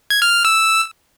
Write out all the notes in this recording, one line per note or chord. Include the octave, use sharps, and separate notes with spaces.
G#6
F6
F6
E6